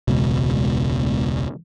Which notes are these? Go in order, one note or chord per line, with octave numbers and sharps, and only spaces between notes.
E1 C#2 B2